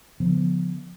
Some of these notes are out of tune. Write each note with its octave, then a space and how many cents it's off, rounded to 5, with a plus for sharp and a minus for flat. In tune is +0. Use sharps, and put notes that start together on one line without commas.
D3 -35 F3 +25 B3 +0